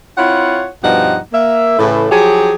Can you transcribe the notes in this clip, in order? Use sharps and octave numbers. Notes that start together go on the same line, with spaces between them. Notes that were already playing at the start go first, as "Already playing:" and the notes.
C4 E4 F4 C#5 F#5
G2 B2 F3 G3 D#4 F#5
A#3 E5
A2 C#3 E3
F3 F#3 G4 G#4